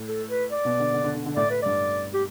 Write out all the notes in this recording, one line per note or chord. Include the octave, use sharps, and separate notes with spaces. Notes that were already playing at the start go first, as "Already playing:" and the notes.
Already playing: A2
A4
B4
D5
B2
D3
D3
D3
D3
D3
A2 D5
B4
G2 D5
G4